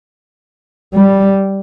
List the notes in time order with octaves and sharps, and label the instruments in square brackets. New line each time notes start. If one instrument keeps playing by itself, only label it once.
[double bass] G3